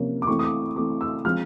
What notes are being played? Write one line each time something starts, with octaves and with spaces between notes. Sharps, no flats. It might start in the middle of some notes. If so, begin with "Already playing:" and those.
Already playing: C3 F3 A#3 C#4
D6
E3 A3 C4 C#6
D#6
D6
E3 A3 C4 D6
E6
F3 G#3 C4 F6